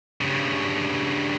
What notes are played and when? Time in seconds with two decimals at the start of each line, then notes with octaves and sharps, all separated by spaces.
0.21 G2 C#3